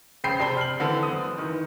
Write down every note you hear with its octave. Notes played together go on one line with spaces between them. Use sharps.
F1 C#3 C5 G5 B5 C7
C3 D4 C5 A5 B5 G7
F6 F#7
D3 E3 C4 A4
F#1 D#6
D#3 E3